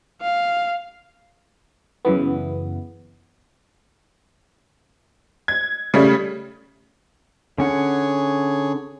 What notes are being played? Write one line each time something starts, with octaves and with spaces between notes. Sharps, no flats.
F5
F#2 C#3 E3 B3
G#6
C#3 G3 A3
D3 C#4 G#4 C#5 F#5